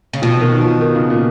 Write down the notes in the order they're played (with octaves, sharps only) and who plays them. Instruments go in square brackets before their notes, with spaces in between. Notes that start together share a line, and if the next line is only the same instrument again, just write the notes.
[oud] C#3
[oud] B2 [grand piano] F3
[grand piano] D#3
F3
D#3
C#3
A#2